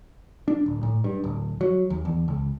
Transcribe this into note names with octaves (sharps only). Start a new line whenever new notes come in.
D4
D1
A2
G2
D1
F#3
D#2
E2
C#2